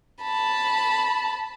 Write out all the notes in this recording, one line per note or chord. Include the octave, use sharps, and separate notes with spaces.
A5 B5